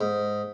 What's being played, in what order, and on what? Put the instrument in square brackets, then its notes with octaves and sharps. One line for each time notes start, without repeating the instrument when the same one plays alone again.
[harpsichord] G#2